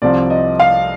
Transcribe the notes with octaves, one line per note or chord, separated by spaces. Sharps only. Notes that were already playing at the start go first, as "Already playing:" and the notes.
C2 C3 F3 C4 D5
D#5
F5